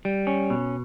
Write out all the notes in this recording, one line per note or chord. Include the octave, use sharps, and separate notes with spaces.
G3
C#4
B2